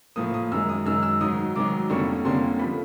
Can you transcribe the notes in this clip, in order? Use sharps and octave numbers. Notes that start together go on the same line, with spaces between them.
A2 F3 A#3 D#6
D#6
F#2 D#3 G#3 E6
D#6
F#2 D#3 G#3 E6
E6
G#2 D#3 F#3 D#6
G#2 D#3 F#3 D6
F2 D3 G3 A#3 C#4 C#6
F2 D3 G3 A#3 C#4 C6
F3 A3 B5